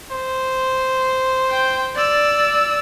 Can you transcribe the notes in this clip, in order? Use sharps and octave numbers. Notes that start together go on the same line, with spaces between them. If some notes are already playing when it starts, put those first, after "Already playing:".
C5
G5
D5 E6